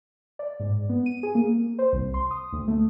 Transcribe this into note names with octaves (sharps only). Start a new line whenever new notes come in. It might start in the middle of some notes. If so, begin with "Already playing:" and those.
D5
G#2
B3
D#7
G#4
A#3
C5
C2
C6
D#6
D2
A3